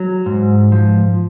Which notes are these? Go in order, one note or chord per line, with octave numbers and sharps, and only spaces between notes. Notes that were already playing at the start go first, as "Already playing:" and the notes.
Already playing: F#3
G#2
F3